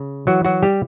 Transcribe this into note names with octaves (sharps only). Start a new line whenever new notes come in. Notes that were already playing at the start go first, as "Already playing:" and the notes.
Already playing: C#3
E3 F#3 F#4
F#3 F#4
G3 G4